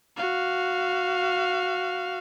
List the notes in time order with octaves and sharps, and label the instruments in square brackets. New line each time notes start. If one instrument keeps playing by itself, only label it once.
[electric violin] F#4 F5